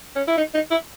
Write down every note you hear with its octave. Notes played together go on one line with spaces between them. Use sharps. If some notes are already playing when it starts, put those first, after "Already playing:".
C#4
E4
D#4
D#4
E4